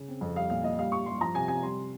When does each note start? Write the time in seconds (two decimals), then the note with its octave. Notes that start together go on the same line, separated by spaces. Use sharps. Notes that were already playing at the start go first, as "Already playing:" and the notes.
Already playing: C#3
0.08 C4
0.21 F2
0.35 G3 F5
0.50 A#2 F5
0.63 A#2 D#5
0.79 G3 F5
0.92 G2 C#6
1.06 G2 C6
1.21 F3 A#5
1.35 C3 G#5
1.48 C3 G#5
1.62 G3 C6